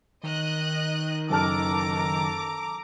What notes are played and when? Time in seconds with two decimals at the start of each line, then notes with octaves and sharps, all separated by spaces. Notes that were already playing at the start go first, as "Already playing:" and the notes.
0.24 D#3 D#5 F#6
1.30 F#1 A4 A5 A#5 D6 F6